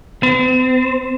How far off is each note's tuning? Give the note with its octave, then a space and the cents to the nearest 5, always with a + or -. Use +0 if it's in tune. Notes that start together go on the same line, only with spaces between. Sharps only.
C4 -45